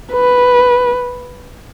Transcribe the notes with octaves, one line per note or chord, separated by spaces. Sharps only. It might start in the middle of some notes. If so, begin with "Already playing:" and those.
B4